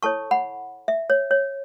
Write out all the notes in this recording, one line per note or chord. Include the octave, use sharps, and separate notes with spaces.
E4 A4 C#5 A5 C#6
F#5 B5
E5
C#5
C#5